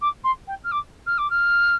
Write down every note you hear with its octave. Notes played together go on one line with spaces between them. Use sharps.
D6
C6
G5
F6
D6
F6
D6
F6